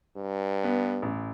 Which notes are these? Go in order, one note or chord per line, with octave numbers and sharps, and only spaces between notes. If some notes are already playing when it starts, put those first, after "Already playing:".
G2
B3
A1